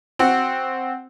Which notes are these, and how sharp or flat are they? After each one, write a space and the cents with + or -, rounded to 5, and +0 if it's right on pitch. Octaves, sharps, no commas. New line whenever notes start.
C4 +0 F#4 +0